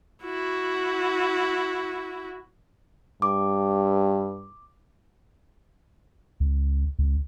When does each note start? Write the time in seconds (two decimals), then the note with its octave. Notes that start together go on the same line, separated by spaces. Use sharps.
0.24 E4 F#4
3.22 G2 D6
6.40 C#2
6.99 C#2